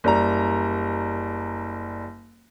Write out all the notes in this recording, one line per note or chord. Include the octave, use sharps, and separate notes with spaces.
F#1 G3 A#5